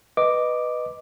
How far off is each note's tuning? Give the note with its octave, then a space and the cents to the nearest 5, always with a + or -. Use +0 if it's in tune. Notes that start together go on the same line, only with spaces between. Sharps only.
B4 +0 D#5 -10 D6 +0